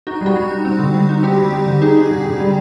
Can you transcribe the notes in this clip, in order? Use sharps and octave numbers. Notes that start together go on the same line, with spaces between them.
D#4 F#4
G3 F#4
G3
D#4
C4
D3
G3
D#4
C4 G4
G3
G3
D3
D#4 G#4
D#4
D3
D3
G3